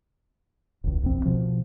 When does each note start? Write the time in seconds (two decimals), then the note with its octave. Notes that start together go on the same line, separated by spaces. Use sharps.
0.84 E1 C#2
1.02 D1 A#1 E2 C4
1.25 B2 F3